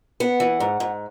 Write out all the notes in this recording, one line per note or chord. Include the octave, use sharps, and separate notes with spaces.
B3 F#5
E3
G#2
G#2